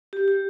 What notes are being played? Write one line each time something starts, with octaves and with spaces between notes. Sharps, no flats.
G4
G4